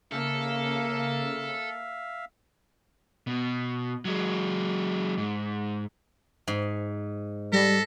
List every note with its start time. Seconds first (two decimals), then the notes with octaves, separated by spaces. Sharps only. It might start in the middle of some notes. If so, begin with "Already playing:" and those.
0.11 C#3 A#3 A4 E5 F5
3.27 B2
4.05 F#3 G#3
5.18 G#2
6.48 G#2
7.53 G3 A4 A#6 B6